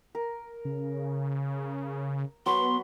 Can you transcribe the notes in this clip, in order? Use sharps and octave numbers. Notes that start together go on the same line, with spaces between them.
A#4
C#3
F#3 B3 B4 C6